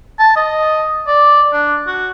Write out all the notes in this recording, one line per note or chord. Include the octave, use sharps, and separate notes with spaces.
A5
D#5
D5
D4
F#4